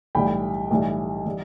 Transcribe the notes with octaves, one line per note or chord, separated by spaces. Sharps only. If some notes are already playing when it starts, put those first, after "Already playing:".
B1 A2 E3 G3 G5 B5
B1 A2 E3 G3
E3 G3